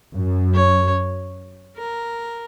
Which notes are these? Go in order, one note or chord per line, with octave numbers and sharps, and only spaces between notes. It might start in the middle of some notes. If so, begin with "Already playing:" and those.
F#2
C#5
A#4